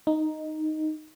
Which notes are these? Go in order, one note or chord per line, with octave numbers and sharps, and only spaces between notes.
D#4